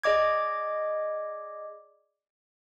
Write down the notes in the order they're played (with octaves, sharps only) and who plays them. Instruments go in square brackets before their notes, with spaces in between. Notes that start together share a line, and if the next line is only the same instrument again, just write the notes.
[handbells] G#4 D5 D#5 D6 G#6